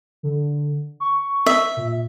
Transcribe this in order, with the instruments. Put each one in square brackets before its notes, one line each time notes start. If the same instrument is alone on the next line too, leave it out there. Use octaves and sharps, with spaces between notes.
[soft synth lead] D3
C#6
[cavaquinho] E5
[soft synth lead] A#2